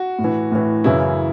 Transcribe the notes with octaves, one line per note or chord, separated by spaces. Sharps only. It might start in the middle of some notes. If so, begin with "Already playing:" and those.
Already playing: F#4
A2
E3
A2 E3
F#2 C#3 E3 E4